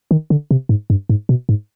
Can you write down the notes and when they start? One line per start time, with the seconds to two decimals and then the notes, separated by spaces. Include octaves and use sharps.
0.11 D#3
0.30 D3
0.51 C3
0.69 G#2
0.90 G2
1.09 G#2
1.29 B2
1.49 G#2